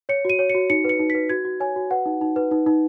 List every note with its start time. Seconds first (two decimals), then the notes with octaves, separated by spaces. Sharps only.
0.09 C#5 C#7
0.25 F#4 D#7
0.39 C#5
0.50 C#7
0.55 F#4
0.70 D#4 C#7
0.84 B4 C#7
0.99 D#4
1.10 B4 B6
1.29 F#4 G#6
1.45 F#4
1.60 C#5 G#5
1.76 F#4
1.91 B4 F#5
2.06 D#4
2.21 D#4
2.36 B4
2.51 D#4
2.66 D#4